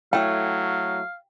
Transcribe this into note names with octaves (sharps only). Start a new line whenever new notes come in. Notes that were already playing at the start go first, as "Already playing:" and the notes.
F#3 A3 E4 C#5 F5 G5